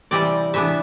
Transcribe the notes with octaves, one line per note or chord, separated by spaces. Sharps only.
C3 E3 G3 C4 D5
C3 E3 B3 D4 E5